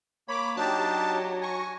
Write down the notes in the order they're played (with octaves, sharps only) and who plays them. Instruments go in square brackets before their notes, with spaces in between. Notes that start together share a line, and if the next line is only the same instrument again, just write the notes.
[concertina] A#3 C#5 [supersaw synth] B5 D6
[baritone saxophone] F#3 [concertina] D4 D#4 [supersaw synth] G4 A5
[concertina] G#5 [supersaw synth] C#6 A#6